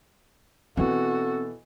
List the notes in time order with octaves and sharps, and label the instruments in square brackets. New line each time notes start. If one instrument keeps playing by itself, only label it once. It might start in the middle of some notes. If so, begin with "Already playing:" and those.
[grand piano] B2 E3 [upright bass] C4 D4 [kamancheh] F#4 [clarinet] A4